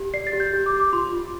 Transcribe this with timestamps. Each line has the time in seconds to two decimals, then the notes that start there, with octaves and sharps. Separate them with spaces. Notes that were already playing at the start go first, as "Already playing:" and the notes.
Already playing: G4
0.14 D5 C7
0.27 A6
0.33 G4
0.40 G6
0.53 G4
0.66 D6
0.73 G4
0.80 D6
0.93 F4 C6
1.13 F4